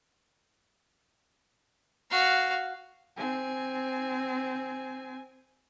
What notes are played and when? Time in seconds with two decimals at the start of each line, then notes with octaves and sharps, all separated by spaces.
2.11 F#4 F5
3.17 C4 G#5